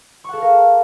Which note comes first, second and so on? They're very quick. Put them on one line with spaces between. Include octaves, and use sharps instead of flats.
C#6 F#5 A4 F5 A#4